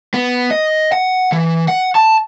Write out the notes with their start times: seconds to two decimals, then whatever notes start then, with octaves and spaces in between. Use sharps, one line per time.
0.14 B3
0.51 D#5
0.92 F#5
1.32 E3
1.68 F#5
1.95 A5